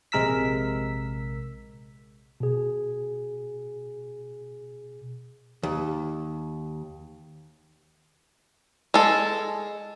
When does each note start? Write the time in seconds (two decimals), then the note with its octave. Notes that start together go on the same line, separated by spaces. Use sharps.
0.12 A#1 C3 G#3 A#4 E6 B6
2.40 B2 G#4
5.63 D#2
8.94 G#3 A4